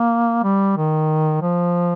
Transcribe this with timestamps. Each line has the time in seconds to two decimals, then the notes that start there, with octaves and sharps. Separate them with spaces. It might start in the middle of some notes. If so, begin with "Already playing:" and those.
Already playing: A#3
0.44 G3
0.77 D#3
1.42 F3